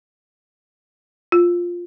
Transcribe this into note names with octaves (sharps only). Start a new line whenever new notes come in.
F4